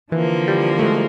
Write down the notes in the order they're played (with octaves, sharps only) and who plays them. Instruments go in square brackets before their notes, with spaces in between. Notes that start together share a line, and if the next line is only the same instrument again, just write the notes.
[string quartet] D3 F3 A#3 [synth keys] E3
[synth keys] G3
A3
G#3